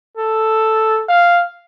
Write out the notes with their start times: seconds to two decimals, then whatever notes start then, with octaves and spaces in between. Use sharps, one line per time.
0.17 A4
1.09 F5